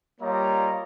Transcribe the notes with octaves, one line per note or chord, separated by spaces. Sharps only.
G3 A#3 F4 C#5 D#5 A#5